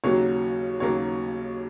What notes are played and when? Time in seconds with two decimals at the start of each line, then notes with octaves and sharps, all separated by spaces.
0.04 D#2 C#3 F#3 A#3 C#5
0.80 D#2 C#3 F#3 A#3 C#5